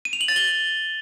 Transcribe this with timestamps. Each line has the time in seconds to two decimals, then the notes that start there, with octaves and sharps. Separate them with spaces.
0.05 D#7
0.13 F7
0.21 F#7
0.28 A6
0.36 G7